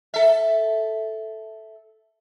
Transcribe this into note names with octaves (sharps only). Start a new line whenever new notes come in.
A4 E5